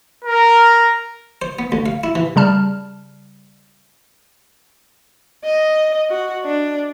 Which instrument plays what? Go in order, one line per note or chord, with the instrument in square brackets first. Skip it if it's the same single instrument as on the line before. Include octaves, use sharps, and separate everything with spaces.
[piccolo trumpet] A#4
[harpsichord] C5
B3
D2
F5
E4
E3
[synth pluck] C#3 G3 A5 F6
[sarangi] D#5
F#4
D4